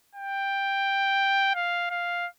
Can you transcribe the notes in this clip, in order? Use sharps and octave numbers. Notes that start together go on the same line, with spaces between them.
G5
F5
F5